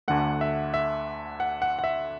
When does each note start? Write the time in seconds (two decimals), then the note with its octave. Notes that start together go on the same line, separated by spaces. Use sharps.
0.08 D2 D3 A3 F#5
0.41 E5
0.74 E5
1.40 F#5
1.62 F#5
1.79 F#5
1.84 E5